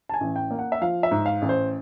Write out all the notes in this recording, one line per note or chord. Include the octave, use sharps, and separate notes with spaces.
A5
G#5
A1
G5
A#3
F#5
E5
F3 F5
E5
G#2
F5
A1
C5